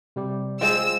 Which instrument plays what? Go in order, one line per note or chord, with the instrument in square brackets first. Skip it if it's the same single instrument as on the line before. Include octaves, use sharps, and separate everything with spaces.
[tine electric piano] C3 G3 G4
[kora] G#3 C4 G5 [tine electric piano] F4 [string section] E6